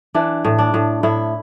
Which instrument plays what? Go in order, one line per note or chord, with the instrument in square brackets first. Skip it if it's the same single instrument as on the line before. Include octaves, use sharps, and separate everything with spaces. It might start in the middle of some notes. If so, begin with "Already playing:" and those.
[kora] E3 D4
A2
D4
A2
A2 E4